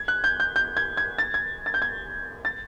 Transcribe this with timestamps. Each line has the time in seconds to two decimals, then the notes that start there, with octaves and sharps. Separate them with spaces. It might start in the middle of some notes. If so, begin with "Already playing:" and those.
Already playing: G#6
0.08 F#6
0.24 G6
0.40 G6
0.56 G6
0.77 G#6
0.97 G#6
1.18 A6
1.34 G#6
1.66 A6
1.74 G6
1.82 G#6
2.45 A6